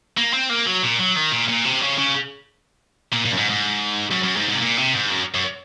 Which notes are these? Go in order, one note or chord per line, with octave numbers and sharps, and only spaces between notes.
A#3
C4
A#3
F#3
A#2
F#3
D#3
A#2
A#2
C3
C#3
C#3
A#2
A#2
F#2
G#2
G#2
F#2
F#2
G#2
G#2
C3
A#2
C3
G#2
F#2
F#2